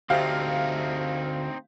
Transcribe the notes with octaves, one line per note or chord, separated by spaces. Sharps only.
D2 C4 D#4 G4 C5 E5 F5